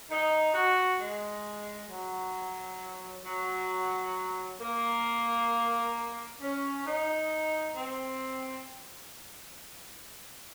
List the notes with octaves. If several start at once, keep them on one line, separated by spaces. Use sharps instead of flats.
D#4
F#4
G#3
F#3
F#3
A#3
C#4
D#4
C4